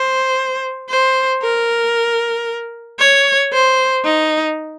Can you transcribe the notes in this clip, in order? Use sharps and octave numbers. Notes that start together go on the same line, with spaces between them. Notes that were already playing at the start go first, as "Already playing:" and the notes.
Already playing: C5
C5
A#4
C#5
C5
D#4